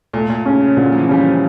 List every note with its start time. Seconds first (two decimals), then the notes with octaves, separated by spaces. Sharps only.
0.14 A#2 A3
0.30 A#2
0.46 C#3 C#4
0.61 C#3
0.77 A#2 D3
0.92 F3
0.98 E3
1.09 G3 C#4
1.20 F3